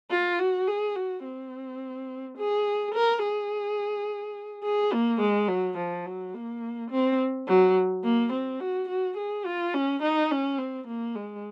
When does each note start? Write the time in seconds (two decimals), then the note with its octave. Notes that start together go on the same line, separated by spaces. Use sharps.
0.11 F4
0.39 F#4
0.68 G#4
0.96 F#4
1.24 C4
2.38 G#4
2.95 A#4
3.23 G#4
4.64 G#4
4.93 A#3
5.20 G#3
5.49 F#3
5.78 F3
6.06 F#3
6.34 A#3
6.91 C4
7.48 F#3
8.04 A#3
8.33 C4
8.60 F#4
8.89 F#4
9.17 G#4
9.46 F4
9.74 C#4
10.02 D#4
10.31 C#4
10.58 C4
10.87 A#3
11.15 G#3